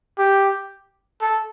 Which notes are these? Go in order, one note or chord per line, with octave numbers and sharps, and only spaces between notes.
G4
A4